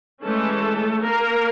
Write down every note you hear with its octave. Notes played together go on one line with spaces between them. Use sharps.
E3 G#3 A3 C#4 A4
A#3 A#4